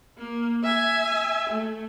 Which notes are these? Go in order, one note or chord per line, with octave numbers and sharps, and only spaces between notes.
A#3
E5 G#5
A3